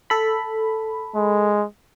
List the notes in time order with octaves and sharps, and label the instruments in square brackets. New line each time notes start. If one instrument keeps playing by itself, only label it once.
[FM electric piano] A4 B5
[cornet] G#3